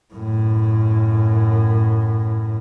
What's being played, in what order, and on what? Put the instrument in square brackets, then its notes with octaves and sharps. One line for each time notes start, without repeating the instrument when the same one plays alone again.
[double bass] F#2 A2